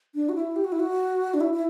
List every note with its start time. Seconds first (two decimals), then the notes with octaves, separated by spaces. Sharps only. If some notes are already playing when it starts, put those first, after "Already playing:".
0.15 D4
0.29 F#4
0.35 E4
0.56 G4
0.64 F#4
0.72 E4
0.80 F#4
1.34 D4
1.41 E4
1.53 E4